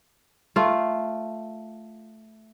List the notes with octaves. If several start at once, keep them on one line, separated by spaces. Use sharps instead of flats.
A3 F4